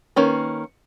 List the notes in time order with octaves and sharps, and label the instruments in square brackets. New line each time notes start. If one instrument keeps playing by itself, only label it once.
[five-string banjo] D#3 A#3 C#4 B4